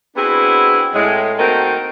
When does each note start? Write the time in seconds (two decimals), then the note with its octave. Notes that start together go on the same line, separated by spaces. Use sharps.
0.16 B3 C4 D4 E4 F#4 G#4
0.94 A2 G#3
1.38 A3 A#3 C4 D#4 F#4 A#4